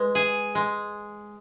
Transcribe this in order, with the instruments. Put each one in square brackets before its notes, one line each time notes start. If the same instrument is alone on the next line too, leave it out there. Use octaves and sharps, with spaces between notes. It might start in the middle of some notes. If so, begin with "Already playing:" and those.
Already playing: [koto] G#3 [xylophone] B4
[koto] G#4
G#3